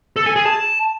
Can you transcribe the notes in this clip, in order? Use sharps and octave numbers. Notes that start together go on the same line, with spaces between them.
A4
G#5
G#4
A5